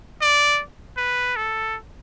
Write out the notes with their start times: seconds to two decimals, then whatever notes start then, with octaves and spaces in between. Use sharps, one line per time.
0.21 D5
0.97 B4
1.36 A4